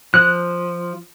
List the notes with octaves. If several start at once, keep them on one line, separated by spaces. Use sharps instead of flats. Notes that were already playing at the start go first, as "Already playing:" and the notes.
F3 F#6